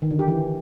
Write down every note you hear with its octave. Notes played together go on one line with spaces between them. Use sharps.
D#3
D3
G4
E3